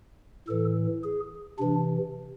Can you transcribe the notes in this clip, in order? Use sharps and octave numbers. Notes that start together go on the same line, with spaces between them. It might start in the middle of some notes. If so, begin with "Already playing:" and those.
A2 E3 A4
G#4
C3 E3 D4